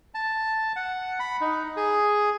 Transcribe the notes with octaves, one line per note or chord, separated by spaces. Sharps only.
A5
F#5
B5
D#4
G#4